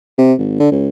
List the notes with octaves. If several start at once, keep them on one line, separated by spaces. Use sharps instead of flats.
C3
G#1
D3
C#2